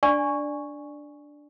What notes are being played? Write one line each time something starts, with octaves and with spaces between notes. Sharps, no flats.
D4 D5 G#5 C#6